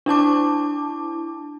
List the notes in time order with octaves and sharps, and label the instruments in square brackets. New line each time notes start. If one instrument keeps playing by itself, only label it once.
[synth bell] D4 E4 A5 D6